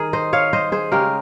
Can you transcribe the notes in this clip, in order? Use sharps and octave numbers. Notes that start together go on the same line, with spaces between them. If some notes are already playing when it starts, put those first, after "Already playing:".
Already playing: D#3 G#4 A#4
C5 D#5
C#5 F5
C5 D#5
G#4 C5
C#3 G#3 C#4 G4 A#4